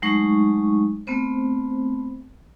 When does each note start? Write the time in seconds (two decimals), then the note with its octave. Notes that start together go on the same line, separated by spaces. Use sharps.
0.02 F#3 G#3 A3 D#4 C#6
1.07 A3 B3 C4 C5